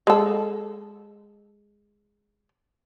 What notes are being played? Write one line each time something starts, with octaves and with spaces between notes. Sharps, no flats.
G#3 A4